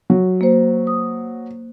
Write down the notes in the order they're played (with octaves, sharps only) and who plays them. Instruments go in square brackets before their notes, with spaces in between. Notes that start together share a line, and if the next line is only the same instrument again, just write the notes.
[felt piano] F#3
[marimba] A#3 C5
D#6